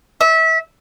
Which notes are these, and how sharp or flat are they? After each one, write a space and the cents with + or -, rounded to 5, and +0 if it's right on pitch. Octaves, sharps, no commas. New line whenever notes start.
E5 -25